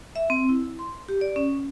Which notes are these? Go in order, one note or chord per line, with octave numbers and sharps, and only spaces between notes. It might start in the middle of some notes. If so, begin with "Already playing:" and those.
E5
C4
E4
C6
G4
D5
C#4